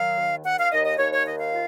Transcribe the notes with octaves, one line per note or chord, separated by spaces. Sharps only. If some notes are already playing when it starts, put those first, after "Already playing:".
Already playing: D#3 F#3 F5
D#2
D#2 F#5
F5
D#2 D#5
D#5
D#2 C#5
C#5
D#3 D#5
F5
F4